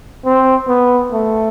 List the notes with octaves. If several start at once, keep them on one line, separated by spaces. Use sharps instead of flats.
C4
B3
A3